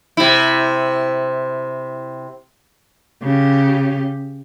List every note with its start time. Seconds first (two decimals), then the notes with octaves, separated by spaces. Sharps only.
0.17 C3 E4
3.23 C#3 G4